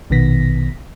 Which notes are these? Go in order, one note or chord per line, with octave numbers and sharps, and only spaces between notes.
A#1 B2 D#3 B3 A#6 B6